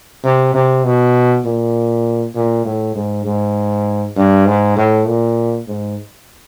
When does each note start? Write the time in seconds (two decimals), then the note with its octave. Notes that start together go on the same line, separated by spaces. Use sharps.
0.24 C3
0.54 C3
0.84 B2
1.45 A#2
2.35 A#2
2.65 A2
2.96 G#2
3.25 G#2
4.16 G2
4.46 G#2
4.77 A2
5.07 A#2
5.68 G#2